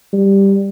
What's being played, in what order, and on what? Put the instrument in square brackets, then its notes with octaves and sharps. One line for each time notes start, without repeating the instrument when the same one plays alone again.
[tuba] G3